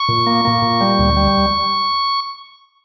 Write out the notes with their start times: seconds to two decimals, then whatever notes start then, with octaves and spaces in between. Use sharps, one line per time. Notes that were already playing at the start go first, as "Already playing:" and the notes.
Already playing: C#6
0.09 A#2
0.27 A#3
0.45 A#3
0.62 A#2
0.81 G3
0.99 D2
1.17 G3